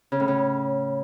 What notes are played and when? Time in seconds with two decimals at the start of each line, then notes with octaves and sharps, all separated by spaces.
0.12 C#3
0.20 A2
0.28 C#3